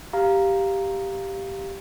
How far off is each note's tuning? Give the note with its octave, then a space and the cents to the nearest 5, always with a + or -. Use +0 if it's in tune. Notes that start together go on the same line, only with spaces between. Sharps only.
G4 +0 F5 +0 A#5 +0